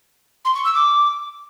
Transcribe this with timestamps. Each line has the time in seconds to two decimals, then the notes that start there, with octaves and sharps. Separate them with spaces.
0.45 C6
0.55 C#6
0.65 E6
0.75 D6